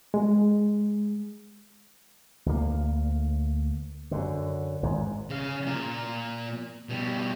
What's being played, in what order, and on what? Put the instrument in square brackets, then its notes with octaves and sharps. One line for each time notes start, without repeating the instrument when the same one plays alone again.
[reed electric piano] G#3
[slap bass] D2 A#3
F#2 D3
G#1 G#2
[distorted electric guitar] C#3 F5
A#2 A#4
B2 G3